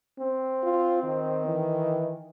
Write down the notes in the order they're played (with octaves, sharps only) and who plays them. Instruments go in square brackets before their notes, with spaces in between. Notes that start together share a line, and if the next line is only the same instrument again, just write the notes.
[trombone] C4
[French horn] F4
D#3
[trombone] E3